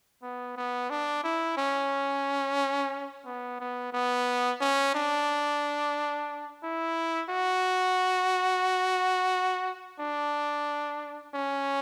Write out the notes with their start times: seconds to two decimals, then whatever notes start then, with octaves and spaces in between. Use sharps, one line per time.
0.23 B3
0.57 B3
0.90 D4
1.24 E4
1.57 C#4
3.26 B3
3.60 B3
3.93 B3
4.61 C#4
4.95 D4
6.63 E4
7.29 F#4
9.99 D4
11.34 C#4